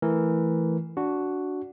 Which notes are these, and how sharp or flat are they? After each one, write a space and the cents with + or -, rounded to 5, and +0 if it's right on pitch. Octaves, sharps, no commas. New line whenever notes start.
E3 +0 A3 +0 A#4 +0
D4 -15 F#4 +0